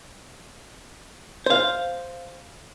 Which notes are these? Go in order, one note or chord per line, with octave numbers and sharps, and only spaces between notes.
C5 F5